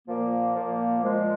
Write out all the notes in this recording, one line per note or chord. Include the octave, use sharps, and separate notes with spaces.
A#2 F3 A#3
A#2 F3
A#2 F3 G#3